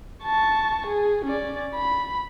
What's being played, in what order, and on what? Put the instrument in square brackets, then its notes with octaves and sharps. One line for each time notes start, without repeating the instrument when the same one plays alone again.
[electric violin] A5 C#6
G#4
C#4 D5
B5